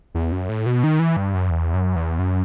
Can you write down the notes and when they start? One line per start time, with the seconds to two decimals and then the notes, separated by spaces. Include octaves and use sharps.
0.15 E2
0.32 F#2
0.49 A2
0.66 B2
0.84 D#3
0.99 E3
1.17 G2
1.34 F#2
1.50 E2
1.74 F#2
1.96 E2
2.19 F#2